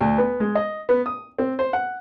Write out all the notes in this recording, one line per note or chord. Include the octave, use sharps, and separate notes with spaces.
D2
B3
G#3
D#5
B3
D#6
C4
C5
F#5